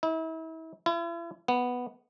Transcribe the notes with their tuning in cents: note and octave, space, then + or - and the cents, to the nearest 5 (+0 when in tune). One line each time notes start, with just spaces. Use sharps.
E4 -40
E4 +40
B3 +0